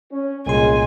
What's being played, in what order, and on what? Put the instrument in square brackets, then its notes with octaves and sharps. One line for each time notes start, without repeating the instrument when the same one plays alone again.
[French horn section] C#4
[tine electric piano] C2 A#2 C6 [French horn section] C#3 G#3 [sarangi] G#5